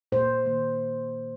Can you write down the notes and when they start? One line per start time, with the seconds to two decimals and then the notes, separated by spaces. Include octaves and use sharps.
0.12 A#2 A#3 C5
0.46 D#3 A#3